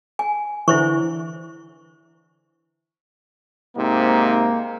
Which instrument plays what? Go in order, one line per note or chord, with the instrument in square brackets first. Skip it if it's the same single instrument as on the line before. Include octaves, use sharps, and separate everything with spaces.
[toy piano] G#5
[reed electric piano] D3 E3 [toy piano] E4 C5 C#6
[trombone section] G#2 C3 D#4 [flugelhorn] A#3